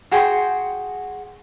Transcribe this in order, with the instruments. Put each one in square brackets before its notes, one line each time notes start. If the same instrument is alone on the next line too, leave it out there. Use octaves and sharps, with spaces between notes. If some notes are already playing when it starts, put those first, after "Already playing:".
[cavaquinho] F#4 G#4 G5 C6